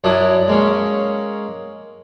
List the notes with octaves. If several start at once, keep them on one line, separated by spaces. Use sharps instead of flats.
F#2 F#3 D4 E4 D6 D#6
G#3 A#3 C#4